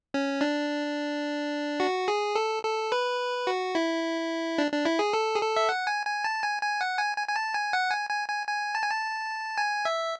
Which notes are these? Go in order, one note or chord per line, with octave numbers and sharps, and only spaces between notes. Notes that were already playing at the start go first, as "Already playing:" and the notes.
C#4
D4
F#4
G#4
A4
A4
B4
F#4
E4
D4
D4
E4
G#4
A4
G#4
A4
E5
F#5
G#5
G#5
A5
G#5
G#5
F#5
G#5
G#5
G#5
A5
G#5
F#5
G#5
G#5
G#5
G#5
A5
G#5
A5
G#5
E5